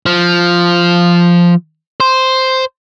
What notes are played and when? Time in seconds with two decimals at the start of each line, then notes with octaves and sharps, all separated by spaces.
0.06 F3
2.00 C5